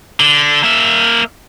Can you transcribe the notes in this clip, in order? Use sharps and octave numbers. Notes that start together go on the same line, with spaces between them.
D3
A#3 E5